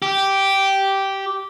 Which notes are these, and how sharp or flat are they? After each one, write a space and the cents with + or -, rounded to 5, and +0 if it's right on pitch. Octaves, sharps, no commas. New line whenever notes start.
G4 -10